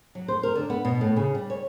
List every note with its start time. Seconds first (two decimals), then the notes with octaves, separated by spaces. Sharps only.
0.15 F#3
0.28 C5
0.43 A#4
0.55 D3
0.70 B3
0.85 B2
1.01 A2
1.16 C#3
1.35 G3
1.50 C#5